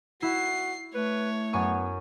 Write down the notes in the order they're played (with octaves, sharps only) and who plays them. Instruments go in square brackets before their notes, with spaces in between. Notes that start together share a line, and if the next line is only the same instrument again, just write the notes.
[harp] E4 [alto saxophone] F#4 [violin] C7
[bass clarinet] A3 [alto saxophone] B4 [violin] C#5
[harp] F#2 G#5 C#6 [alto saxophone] B3